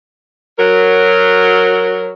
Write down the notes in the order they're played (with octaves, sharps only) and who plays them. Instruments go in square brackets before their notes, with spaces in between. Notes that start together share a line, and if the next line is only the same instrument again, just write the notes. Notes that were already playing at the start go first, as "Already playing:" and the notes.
[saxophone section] F#3 A#4